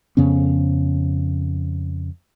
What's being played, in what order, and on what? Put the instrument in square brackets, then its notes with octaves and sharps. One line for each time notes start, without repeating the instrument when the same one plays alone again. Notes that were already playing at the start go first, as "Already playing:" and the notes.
[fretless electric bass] F2 C#3 B3 C#4